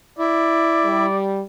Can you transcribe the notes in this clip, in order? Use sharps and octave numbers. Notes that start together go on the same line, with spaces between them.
E4 D5
G3